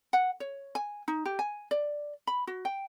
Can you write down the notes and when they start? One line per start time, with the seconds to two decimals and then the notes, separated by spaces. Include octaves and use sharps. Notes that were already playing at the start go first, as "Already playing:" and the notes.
0.13 F#5
0.40 C#5
0.75 G#5
1.08 D#4
1.25 G4
1.39 G#5
1.71 D5
2.27 B5
2.47 F#4
2.65 G5